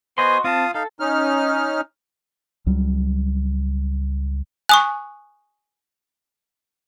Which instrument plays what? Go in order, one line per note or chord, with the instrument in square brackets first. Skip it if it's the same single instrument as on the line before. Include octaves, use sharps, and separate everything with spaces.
[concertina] B3 C5 G#5 [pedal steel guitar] F#4 D#5 C6
[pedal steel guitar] C4 A5 [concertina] F4 F5 D#6
[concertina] D#4 F5 [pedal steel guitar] A4
[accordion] C#4 D#4 F6
[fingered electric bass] C#2 F#3 G3
[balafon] G#5 [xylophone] C#6 D#6 F#6